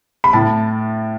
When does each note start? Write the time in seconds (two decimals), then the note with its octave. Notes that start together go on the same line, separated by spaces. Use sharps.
0.24 B5
0.33 A2 A5